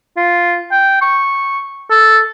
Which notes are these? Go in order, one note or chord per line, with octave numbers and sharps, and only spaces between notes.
F4
G5
C#6
A4